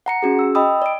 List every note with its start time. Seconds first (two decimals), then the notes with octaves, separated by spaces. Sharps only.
0.06 F#5 A#5 C#7
0.23 C#4 F#4 G#4
0.39 E6
0.55 D#5 G5 B5 D#6 E6
0.82 D5 D7